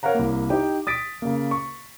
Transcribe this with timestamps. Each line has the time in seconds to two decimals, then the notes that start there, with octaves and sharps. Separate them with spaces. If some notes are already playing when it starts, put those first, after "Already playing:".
0.03 A#4 C#5 F5 F#5 A#5
0.15 C2 A#3
0.50 D#4 G4 G5
0.87 D#6 A6 B6 D7
1.22 C#3 A#3
1.51 C#6